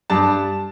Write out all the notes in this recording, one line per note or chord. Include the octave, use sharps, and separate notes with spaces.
G2 A5